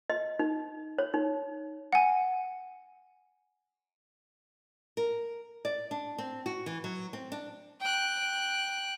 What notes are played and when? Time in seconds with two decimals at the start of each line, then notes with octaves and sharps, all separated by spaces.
0.10 D#5
0.39 D#4
0.98 C#5
1.14 D#4
1.93 F#5 G#5
4.97 A#4
5.65 D5
5.91 D4
6.18 C4
6.46 F#4
6.66 E3
6.84 F#3
7.13 C4
7.32 D4
7.81 G5 F#6